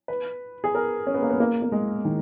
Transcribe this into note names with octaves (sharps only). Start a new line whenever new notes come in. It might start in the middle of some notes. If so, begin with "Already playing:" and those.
B4
G#4
A#4
C#4
B3
A#3
B3
A#3
A#3
G#3
D#3